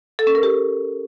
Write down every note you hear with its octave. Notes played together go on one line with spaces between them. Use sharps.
A4
C#4
A#4
G4